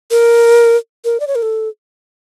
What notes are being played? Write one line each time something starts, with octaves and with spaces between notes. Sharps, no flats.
A#4
A#4
D5
C#5
A#4
A4